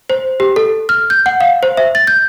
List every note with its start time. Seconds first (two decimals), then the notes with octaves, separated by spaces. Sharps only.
0.10 C5
0.40 G4
0.56 A4
0.89 F6
1.10 G6
1.26 F#5
1.40 F5
1.63 C5
1.77 E5
1.95 A6
2.07 G6